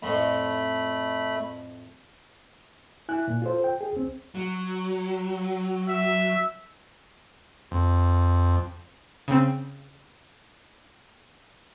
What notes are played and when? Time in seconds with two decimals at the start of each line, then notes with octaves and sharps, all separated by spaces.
0.03 F2 A2 A3 B5
3.09 E4 G#5 F#6
3.28 A#2
3.42 F4 A4 C5
3.64 G5
3.81 G#4
3.93 C#2 C4
4.35 F#3
5.88 E5
7.71 F2
9.28 C#3 C4